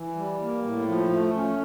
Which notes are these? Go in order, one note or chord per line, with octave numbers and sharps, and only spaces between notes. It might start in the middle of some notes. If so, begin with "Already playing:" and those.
Already playing: E3
G3
A#3
A2
F3
A3
C#4